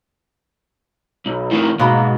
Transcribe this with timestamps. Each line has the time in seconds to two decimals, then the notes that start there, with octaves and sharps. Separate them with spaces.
1.26 B1
1.51 A2 D#3
1.79 G#2 B2 A#3 B5